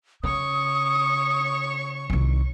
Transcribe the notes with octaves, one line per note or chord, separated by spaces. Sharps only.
C#3 C#5 C#6 D#6
C2 D#3